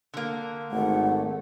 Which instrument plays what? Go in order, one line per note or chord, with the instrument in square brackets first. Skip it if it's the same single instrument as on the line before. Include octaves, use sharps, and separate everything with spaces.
[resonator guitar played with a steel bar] D3 A#3
[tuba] G#1 [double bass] A3 [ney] F#5